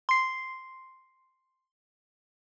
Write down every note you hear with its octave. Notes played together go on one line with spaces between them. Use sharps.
C6 C7